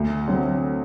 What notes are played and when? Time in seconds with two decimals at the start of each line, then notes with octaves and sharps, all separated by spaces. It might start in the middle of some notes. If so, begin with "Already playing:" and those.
Already playing: D2
0.28 D3 F#3 C4